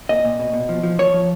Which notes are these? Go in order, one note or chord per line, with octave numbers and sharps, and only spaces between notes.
A#2 D#5
A#2
B2
B2
F3
F3
F3 C#5
F3